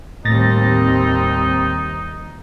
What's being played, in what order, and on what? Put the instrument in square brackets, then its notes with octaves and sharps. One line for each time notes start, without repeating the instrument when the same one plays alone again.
[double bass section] D#2 G3 C4 [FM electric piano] A2 A6 A#6 [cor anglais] D#4